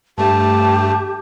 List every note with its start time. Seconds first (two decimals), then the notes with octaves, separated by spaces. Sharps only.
0.18 G2 A3 G4 A5